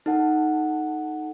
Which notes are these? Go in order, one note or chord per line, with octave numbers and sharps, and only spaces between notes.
D#4 A4 F#5